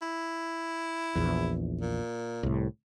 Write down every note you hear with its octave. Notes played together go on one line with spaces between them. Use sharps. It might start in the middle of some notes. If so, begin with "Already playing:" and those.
E4
A#1 E2
A#2
C2 A2